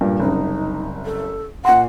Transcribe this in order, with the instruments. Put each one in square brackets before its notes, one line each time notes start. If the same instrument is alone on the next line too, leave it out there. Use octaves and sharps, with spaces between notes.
[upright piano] G2 A#2
[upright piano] F#1 C2 [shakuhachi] D#4
[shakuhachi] A4
[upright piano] A#2 C6 [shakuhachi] F#5